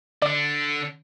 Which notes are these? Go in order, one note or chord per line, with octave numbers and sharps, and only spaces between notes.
D3 D4 D5